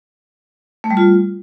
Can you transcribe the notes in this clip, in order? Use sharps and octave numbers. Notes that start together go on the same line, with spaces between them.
A3
G3
F4